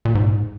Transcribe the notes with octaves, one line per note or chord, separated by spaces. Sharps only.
A#2
G#2